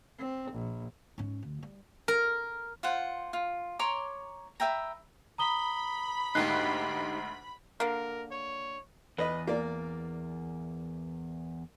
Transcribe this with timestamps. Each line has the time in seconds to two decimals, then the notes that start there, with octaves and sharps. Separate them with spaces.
0.18 C4
0.52 A#1
1.18 G#2 C#4
1.43 D2
1.63 G3
2.08 A#4
2.83 F4 C5 F#5
3.33 F4
3.79 C#5 A#5 C6 D6
4.60 B4 E5 G5 A#5
5.38 A#5 B5 D#6 G7
6.35 D2 G#2 D#4 G4 F#6 C7
7.80 D3 A#3 A#4
8.31 C#5
9.18 E2 B4 D#5 B5
9.47 A#3 D5